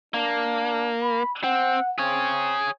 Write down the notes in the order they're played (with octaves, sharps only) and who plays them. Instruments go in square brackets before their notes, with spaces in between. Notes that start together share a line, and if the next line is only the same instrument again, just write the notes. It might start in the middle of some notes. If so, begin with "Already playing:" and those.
[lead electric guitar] A#3 [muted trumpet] D4
[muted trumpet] B5
[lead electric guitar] C4 [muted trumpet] F#5
[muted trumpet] C4 [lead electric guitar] G#4 C#5